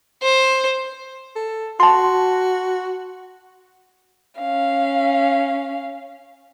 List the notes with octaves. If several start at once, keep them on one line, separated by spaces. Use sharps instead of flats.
C5
A4
F#4 A5 C6
C#4 F5